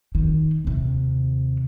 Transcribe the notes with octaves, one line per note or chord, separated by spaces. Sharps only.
D#3
D#2 C3